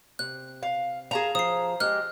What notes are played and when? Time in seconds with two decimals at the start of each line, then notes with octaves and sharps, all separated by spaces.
0.19 C3 F#6
0.63 F5
1.11 F4 G#4 A#4 A5 A#5
1.35 F3 D#6 C7
1.80 G#3 G4 F6 F#6